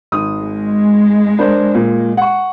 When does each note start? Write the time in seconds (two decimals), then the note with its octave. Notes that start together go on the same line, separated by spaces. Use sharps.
0.12 G#1 D#6
0.41 G#3
1.39 D4 A#4 C5
1.75 A#2
2.17 F#5 C#6